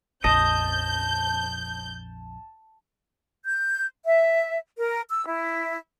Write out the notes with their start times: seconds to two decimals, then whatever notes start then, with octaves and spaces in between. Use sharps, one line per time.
0.24 A#1 F2 D#5 A5 G6
3.45 G6
4.04 E5
4.78 A#4
5.11 E6
5.26 E4